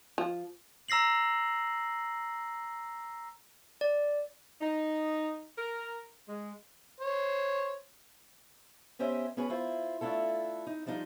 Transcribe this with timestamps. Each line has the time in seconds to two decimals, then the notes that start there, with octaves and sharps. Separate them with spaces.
0.18 F3
0.88 A#5 E6 A#6 C7 F#7
3.81 D5
4.61 D#4
5.58 A#4
6.28 G#3
7.00 C5 C#5
8.99 B3 C#4 G4 C5 D#5 E5
9.37 B3 C#4 F#4 G#4 B4
9.50 E4 F4 C5
10.01 A3 D4 E4 F4 A4
10.67 D#4
10.86 F3 G3 D4 D#4 F4